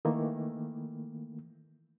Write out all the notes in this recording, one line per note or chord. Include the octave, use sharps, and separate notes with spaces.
D#3 E3 A3 A#3